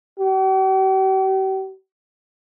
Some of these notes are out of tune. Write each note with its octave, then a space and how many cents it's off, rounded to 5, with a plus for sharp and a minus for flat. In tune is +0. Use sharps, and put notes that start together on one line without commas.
G4 -45